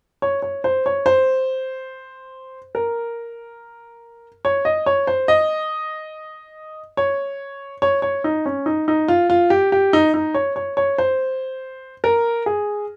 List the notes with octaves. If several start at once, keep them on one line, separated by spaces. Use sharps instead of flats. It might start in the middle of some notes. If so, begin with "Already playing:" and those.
C#5
C#5
C5
C#5
C5
A#4
C#5
D#5
C#5
C5
D#5
C#5
C#5
C#5
D#4
C#4
D#4
D#4
F4
F4
G4
G4
D#4
D#4
C#5
C#5
C#5
C5
A#4
G#4